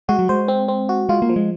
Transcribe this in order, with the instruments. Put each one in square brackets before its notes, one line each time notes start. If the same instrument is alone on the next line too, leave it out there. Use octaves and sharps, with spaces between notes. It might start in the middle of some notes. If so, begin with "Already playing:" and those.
[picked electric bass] G#3 [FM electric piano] F#4
[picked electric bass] F#3
[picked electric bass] G#3 [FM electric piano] C5
[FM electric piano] C4
C4
F#4
[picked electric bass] G#3 [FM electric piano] F4
[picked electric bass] A#3
[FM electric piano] F3
[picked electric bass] G#3